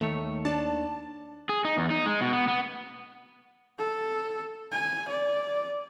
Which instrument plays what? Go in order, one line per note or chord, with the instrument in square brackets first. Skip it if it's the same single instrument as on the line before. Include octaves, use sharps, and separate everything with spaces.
[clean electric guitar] D#2 D#3 C#5 [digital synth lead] A3
[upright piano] D4 [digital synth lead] A5
[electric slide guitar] G#4
D#4
E2
D#4
G#3
B2
B3
B3
[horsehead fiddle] A4
G#5
D5